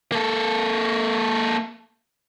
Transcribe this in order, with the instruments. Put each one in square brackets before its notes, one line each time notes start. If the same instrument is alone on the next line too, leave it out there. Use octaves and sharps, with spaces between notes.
[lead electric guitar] A#3 A4